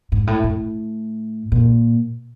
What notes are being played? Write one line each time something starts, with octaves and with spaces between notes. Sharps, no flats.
G#2
A2
A2
A#2